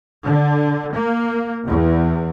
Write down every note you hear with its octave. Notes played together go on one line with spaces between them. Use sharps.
D3
A#3
E2